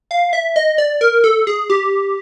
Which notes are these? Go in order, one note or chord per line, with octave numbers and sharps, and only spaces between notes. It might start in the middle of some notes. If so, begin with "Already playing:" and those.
F5
E5
D#5
D5
A#4
A4
G#4
G4